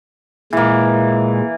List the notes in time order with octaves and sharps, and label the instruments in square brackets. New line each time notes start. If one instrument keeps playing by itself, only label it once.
[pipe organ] A#2 G#3 [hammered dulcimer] E3 A#3